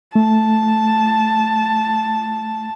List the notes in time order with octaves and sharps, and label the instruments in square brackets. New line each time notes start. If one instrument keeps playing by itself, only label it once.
[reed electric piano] A3 [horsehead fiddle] A5